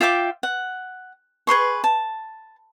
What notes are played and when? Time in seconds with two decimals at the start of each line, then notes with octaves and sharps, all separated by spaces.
0.01 F4 E5 G5 D6
0.43 F#5
1.47 G#4 B4 C6 C#6
1.84 A5